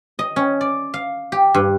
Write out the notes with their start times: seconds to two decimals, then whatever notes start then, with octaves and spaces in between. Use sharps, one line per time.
0.19 D#5
0.36 C#4
0.61 D5
0.94 F5
1.32 G4
1.54 G2